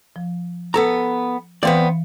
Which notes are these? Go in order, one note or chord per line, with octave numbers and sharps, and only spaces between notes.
F3
B3 A4 A#5
E3 B3 C4 D5 F5